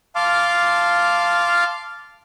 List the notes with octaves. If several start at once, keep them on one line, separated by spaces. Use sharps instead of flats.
F5 A5 C6 D6 F6